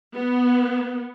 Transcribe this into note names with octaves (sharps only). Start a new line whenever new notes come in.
B3